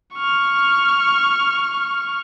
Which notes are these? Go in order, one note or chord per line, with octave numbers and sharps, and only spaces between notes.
C#6 F6